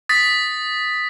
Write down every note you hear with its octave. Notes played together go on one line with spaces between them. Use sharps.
D#6 A6 B6